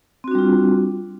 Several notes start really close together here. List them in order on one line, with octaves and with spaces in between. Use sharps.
C4 F#4 D4 G3 F4